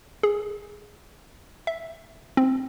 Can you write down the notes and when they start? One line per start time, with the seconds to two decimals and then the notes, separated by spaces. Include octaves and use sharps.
0.23 G#4
1.67 E5
2.37 C4